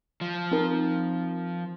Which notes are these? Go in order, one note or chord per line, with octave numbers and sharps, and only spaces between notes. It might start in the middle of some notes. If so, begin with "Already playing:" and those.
F3
C4 D#4 A#4